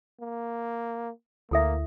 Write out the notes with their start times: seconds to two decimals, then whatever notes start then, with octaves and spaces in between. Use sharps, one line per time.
0.21 A#3
1.51 D2 A#3 E4 A4 E5